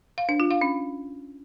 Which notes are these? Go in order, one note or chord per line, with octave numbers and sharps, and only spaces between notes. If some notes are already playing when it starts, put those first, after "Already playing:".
F5
D4
F4
F5
C#4